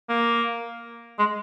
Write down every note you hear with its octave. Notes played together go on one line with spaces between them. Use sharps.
A#3
G#3